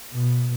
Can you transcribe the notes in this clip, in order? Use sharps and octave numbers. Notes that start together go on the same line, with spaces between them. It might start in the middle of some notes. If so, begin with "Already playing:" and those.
B2